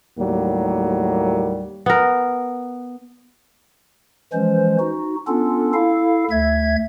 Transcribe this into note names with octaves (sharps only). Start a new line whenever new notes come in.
D#2 A2 F#3 G3 A#3
B3 A#4
E3 F3 G#3 C#4 C5
D#4 F#4
B3 C#4 D4 F4 A4
E4 A4 F5
D2 E5 G#6